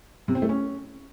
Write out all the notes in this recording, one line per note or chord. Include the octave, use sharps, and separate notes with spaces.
C3
C4
A3
C#4